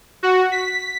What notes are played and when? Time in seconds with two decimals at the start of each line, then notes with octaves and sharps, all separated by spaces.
0.23 F#4
0.52 B6